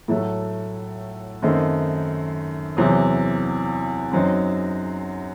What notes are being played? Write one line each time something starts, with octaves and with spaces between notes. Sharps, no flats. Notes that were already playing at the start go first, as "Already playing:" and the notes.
A2 F#3 A3
F#2 D#3 A3 C4 D#4
E2 C3 F#3 C4
F#2 F#3 C4 D#4